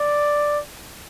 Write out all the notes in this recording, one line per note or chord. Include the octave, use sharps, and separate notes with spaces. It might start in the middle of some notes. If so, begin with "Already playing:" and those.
Already playing: D5